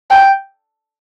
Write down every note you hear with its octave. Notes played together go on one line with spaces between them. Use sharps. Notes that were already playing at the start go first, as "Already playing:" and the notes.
G5